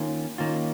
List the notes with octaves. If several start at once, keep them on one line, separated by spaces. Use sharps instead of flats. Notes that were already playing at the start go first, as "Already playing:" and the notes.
Already playing: D#3 A#3 C#4 F4
D#3 A#3 C#4 F4